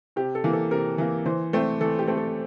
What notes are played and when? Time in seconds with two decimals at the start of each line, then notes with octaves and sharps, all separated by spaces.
0.16 C3 G4
0.35 A4
0.44 E3 A#3
0.53 A4
0.71 C3 A#4
0.98 E3 A#3
1.26 E3 C5
1.53 A3 C4
1.80 E3 A4
1.99 G4
2.07 A3 C4
2.17 A4